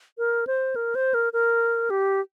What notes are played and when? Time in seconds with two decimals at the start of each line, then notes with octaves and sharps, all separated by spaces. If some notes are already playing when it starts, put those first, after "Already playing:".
0.18 A#4
0.47 C5
0.76 A#4
0.95 C5
1.14 A#4
1.33 A#4
1.90 G4